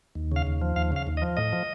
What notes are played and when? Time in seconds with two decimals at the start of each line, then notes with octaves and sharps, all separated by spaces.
0.15 D#2
0.32 C#3 F5
0.47 D#2
0.62 F3
0.76 D#2 F5
0.92 C#3 F5
1.07 D#2
1.17 D#5
1.22 F3
1.37 A2 D#5
1.53 F3